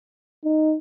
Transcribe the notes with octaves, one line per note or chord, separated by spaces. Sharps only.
D#4